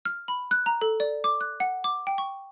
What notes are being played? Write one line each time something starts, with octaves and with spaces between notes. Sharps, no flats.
F6
B5
F#6
A#5
A4
D5
D6
F#6
F#5
D6
G5
C#6